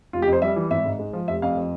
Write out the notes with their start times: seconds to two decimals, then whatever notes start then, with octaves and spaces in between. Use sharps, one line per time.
0.13 F1 F4
0.22 G4
0.27 F2
0.33 C5
0.42 G3 E5
0.56 E3
0.71 G#1 E5
0.85 G#2
0.99 G#3
1.13 F3
1.28 F1 E5
1.42 F2 F5
1.57 F3